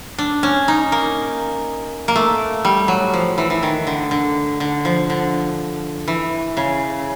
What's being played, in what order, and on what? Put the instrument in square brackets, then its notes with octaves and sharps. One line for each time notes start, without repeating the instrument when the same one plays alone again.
[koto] D4
C#4
D#4
A#3
A#3
A3
G3
F#3
F3
E3
E3
D#3
D3
D3
D3
F3
D3
E3
C#3